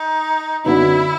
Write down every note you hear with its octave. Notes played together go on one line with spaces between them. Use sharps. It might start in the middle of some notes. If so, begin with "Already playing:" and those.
Already playing: D#4
F#2 D3 F#3 B3 D#4 E4